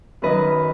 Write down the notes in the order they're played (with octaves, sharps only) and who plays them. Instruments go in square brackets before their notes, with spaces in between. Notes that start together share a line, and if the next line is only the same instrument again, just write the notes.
[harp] F#2 D#3 F#3 B4 D#5